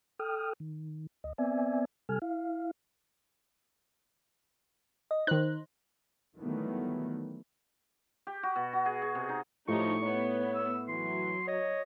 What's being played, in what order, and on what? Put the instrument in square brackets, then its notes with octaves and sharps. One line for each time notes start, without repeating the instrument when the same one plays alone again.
[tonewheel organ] A4 G5 D#6 F6
D#3
D2 D#5
B3 C4 D5 E5 G#5
C3 G3 A4 G#5 F6
E4 F5
[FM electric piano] D#5
[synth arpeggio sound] D#3 F#6 [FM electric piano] D#4 C5
[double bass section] D#3 E3 F#3 G3 A3 B3
[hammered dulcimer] G4
F#4
B2
F#4
G#4
G#4
C3
D#4
[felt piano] A2 [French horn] F3 [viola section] D#4 G4 C#5 [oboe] C#6
[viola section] B3 [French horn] C#5
[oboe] E6
[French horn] E3 [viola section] F#3 [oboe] C6
[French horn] C#5 [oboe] D#5